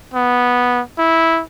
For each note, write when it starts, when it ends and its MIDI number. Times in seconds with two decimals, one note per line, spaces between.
0.14 0.81 59
0.98 1.42 64